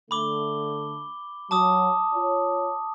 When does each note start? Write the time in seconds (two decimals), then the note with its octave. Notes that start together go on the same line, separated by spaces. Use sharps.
0.11 D3 A3 B5 D6 G7
1.51 F#3 A5 D6 D#6
2.14 F4 C#5